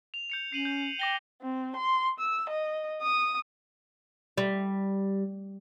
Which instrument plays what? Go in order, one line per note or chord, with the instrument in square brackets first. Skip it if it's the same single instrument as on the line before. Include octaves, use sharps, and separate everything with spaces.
[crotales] F7
G6 C#7 F7
[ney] C#4 [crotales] C7 D#7 F#7
[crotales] G6
[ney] G5 [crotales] D6 A#6 G7
[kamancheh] C4
C6
E6
D#5
D#6
[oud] G3